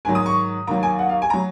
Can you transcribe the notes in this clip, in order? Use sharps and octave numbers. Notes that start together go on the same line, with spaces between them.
G#2 D#3 F#3 G#5
D#6
C#6
D#2 D#3 F#3 A#5
G#5
F#5
F5
G#5
F#3 A#5